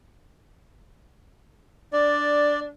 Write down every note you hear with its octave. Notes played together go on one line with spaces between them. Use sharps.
D4 D5